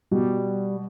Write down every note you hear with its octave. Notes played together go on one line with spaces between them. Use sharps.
B2 G3